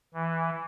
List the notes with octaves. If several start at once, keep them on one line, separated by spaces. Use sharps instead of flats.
E3